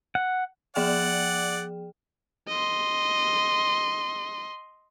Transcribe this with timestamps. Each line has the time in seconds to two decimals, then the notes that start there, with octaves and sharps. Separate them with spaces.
0.15 F#5
0.76 F3 G#4 D5 F#5 G5
2.48 D#5 C6